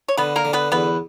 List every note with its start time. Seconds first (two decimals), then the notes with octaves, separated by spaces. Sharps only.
0.08 C#5
0.17 D3 B3 B4
0.36 A#3 A#4
0.45 D3
0.53 B3 B4
0.72 E2 B3 B4